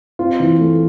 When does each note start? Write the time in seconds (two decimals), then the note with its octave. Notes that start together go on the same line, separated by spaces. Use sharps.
0.19 C4 F4
0.40 E3
0.60 A3